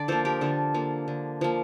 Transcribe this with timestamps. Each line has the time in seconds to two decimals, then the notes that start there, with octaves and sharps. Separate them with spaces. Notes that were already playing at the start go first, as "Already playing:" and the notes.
Already playing: D3 D5
0.08 F3 A#3 A4 C5
0.25 G4 A#4
0.41 D3 F4 A4
0.74 F3 A#3
1.08 D3
1.41 F3 A#3